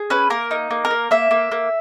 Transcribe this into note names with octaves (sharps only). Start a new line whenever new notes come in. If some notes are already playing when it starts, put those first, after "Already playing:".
Already playing: G#4
C#4 B4
A#3 A#4
D#4
A#3
A#4
A#3
A#3 E5
A#3
A#3